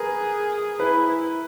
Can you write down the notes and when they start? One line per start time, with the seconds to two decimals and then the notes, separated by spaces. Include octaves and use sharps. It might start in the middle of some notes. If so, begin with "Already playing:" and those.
Already playing: G#4 A#4 B4
0.79 E4 B4